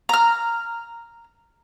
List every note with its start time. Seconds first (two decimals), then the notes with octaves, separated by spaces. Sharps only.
0.09 A#5 F6